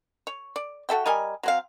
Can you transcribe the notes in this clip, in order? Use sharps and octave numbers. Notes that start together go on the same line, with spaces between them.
C#5
D5
F#4 A4 E5 G5
G3 A#4 D#5 G#5
F#3 C4 F5